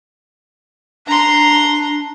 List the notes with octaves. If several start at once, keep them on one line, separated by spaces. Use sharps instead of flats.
D4 A#5 C6